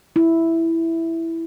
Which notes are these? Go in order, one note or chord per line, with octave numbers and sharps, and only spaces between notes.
E4